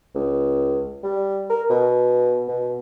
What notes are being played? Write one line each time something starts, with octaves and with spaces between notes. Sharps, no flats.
C#2
G3
A#4
B2
B2